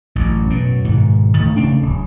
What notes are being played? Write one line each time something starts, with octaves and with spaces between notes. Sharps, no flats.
A1 F#2
F#2 B2
G#2 B2 D#3
D#3 A3
C#3 A3 C4 D4
D1